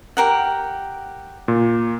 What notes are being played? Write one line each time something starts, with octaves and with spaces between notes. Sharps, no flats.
G4 A#4 F#5
A#2